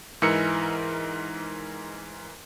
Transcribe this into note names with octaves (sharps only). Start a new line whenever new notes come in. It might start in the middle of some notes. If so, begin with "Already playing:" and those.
G#2 E3 D#4 A#4 E6 C#7